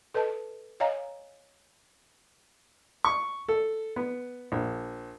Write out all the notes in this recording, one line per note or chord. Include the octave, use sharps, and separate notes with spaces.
A4 B4 D#5 A5
C#5 D#5 F5 G#5 A#5
C#6
A4
B3
A#1